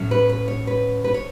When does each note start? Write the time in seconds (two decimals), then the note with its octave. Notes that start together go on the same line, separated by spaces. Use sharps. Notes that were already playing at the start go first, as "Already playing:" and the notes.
Already playing: A2 F#3 C#4
0.11 B4
0.29 B4
0.48 C#5
0.67 B4
1.04 B4
1.14 C#5